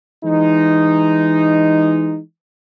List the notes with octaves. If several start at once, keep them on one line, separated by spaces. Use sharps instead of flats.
E3 G#3 D#4